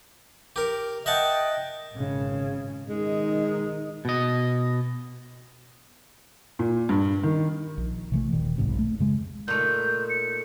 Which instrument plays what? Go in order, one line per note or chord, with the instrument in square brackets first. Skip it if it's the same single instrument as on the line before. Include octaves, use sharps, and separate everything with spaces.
[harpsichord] G4 A#4
[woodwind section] D#5 G5 [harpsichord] E5 F#5 A5
[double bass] G#1 C#3
[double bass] D#3 D#4 [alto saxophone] G#3
[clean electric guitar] B2 D#5
[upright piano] A#2
G2
D#3
[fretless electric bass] A#1
C3 E3 A3
D#1 A#2 D#3
F#1 B1 G#2 C3
A3
F2 C#3 G#3
[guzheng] A#2 A3 D#4 [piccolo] G6
[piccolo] C#7